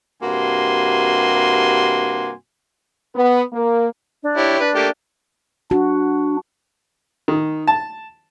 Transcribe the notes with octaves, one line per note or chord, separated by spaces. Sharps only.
G2 C3 A#3 F#4 G#5 C6
B3
A#3
D4
E4 G4 C#5
D4 B4
A3 A#3 G4
D4 F#4
D#3
A5